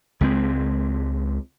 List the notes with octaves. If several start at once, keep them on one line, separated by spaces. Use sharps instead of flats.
C#2 G#3 C4